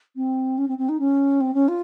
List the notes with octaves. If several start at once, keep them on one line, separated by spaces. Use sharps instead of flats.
C4
C#4
C4
C4
D#4
C#4
C4
C#4
F4